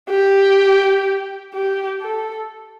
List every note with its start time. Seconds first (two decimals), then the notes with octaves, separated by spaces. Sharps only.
0.10 G4
1.54 G4
2.01 A4